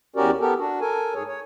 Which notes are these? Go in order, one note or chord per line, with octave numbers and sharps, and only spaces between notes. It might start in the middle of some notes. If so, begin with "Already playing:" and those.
E2 C#4 F#4 G4 A#4 D5
B3 G4 A4 A#4
D4 F#4
A4 A#4 G#5
G#2 G#4 C#5
C#5